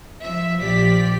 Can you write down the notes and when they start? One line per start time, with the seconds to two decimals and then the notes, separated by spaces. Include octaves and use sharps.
0.22 F3 E5
0.60 A#1 F3 G4 D5 B6